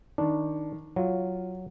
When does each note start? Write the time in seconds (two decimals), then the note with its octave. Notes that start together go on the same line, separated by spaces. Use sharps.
0.18 D#3 D4
0.96 F#3 F4